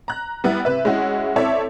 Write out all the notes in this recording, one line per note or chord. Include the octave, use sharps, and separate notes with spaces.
A#5 F#6
G3 B3 E4
C3 B4 E5
G#3 C#4 E4 F#4
C4 E4 A4 C#5 D5 E5